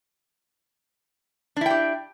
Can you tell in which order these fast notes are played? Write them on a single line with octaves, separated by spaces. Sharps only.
D4 E4 G5 G4